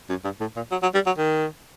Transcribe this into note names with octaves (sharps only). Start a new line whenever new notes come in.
F#2
G2
A2
A#2
F#3
F#3
G3
F#3
D#3